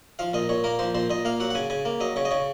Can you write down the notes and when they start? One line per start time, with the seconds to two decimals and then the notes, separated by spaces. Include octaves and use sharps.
0.19 F3 F5
0.34 A#2 D#5
0.49 A#2 C#5
0.64 A#3 A#4
0.79 F3 C5
0.95 A#2 C5
1.10 A#2 D#5
1.25 A#3 F5
1.40 F#3 F#5
1.50 F#5
1.55 C#3 G#5
1.70 C#3 G#5
1.85 A#3
2.00 F#3 D#5
2.16 C#3 C#5
2.25 D#5
2.31 C#3 C#5